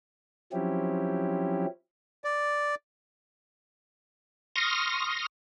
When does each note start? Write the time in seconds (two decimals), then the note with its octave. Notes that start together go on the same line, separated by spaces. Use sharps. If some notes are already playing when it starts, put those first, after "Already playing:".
0.53 F3 F#3 C4 C#4 E4 G4
2.24 D5
4.56 C6 C#6 D#6 F6 A#6